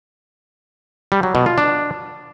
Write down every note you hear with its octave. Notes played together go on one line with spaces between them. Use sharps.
G3
F#3
B2
F4
D4